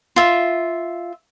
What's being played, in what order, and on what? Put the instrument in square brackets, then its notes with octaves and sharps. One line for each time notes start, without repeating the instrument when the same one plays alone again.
[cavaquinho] F4 E5